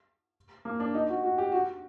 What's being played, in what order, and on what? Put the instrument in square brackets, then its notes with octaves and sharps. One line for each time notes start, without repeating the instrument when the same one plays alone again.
[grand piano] A#3
D4
D#4
F#4
F#4
G4
F#4